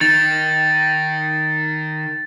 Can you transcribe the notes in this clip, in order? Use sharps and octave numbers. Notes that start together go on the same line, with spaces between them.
D#3 A6